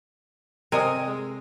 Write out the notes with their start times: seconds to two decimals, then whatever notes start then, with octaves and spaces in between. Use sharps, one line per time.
0.72 C3 A#4 D#5 G#5 D#6
1.07 G#3